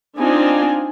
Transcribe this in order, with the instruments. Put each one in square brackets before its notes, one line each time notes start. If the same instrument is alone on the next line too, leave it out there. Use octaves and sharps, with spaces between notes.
[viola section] C4 D4 D#4 F4 G#5